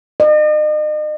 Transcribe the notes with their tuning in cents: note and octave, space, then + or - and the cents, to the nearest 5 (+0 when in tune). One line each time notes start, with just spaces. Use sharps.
D#5 -40